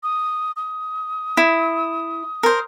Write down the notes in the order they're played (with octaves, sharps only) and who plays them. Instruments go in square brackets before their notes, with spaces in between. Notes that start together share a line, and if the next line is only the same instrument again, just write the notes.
[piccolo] D#6
D#6
[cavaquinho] E4
A#4 C5